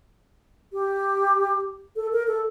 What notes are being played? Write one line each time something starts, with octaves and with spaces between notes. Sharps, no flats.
G4
A4
A#4
A4